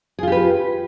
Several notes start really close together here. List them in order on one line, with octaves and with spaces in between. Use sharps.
G#4 F4 G4 B4